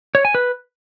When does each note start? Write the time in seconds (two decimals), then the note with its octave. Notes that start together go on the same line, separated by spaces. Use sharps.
0.15 C#5
0.25 G#5
0.35 B4